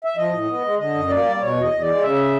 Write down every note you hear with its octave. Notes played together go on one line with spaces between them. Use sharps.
E5
F3 D#5
A2
B3
G#3
D3 D#5
F#2
A#3 D5
G3
B2 C#5
E2 D#5
E2
G#3 D5
C#3 E5